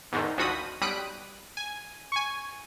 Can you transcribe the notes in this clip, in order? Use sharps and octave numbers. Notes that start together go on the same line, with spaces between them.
E2 G#2 D3 D#3
G#1 D2 F3 F#4 B5 D#6
B1 G3 B5 D#6 F#6 D7
G#5
G#5 C#6